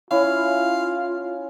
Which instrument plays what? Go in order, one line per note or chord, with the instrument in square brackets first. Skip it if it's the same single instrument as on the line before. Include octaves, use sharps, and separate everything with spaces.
[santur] C#4 E4 [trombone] F4 [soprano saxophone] F5